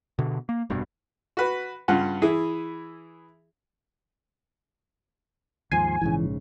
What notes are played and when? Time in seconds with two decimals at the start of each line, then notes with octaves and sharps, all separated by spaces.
0.19 B2 D3
0.49 A#3
0.70 F1 G2 B2
1.37 F#4 B4
1.88 G2 C#3 F4 F#5
2.22 E3 E4 G#4
5.72 D#2 G#2 F3 G#5 C6
6.01 A#1 G#2 C#3 E3